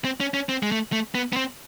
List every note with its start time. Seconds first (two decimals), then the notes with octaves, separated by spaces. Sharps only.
0.05 C4
0.20 C#4
0.34 C#4
0.49 C4
0.63 G#3
0.72 A3
0.92 A3
1.15 B3
1.33 B3
1.37 C4